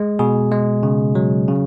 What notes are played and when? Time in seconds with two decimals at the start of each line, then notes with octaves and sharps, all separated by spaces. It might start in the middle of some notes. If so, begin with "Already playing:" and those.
Already playing: G#3
0.19 B2 G#4
0.52 G#3
0.83 C#3
1.15 F#3
1.48 C#3